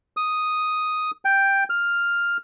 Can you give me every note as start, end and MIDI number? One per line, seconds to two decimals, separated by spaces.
0.17 1.11 87
1.25 1.64 79
1.70 2.37 89